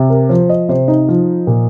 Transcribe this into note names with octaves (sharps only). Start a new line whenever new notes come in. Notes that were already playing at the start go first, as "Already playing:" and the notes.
Already playing: C3
A#4
F3 C5
D#5
C3 C5
D#4
F3
A#2